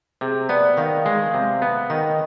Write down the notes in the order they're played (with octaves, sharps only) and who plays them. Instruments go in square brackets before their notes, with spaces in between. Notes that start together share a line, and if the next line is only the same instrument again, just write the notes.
[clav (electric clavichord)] C3 [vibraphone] G#4
[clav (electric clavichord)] B3 [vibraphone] D5
[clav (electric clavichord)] D#3 [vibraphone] F5
[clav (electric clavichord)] G#3
C3
B3
[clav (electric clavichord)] D#3 [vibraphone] D#5